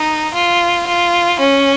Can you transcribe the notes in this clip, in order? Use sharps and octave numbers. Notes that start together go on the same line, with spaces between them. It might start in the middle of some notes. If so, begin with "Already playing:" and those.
Already playing: D#4
F4
F4
C#4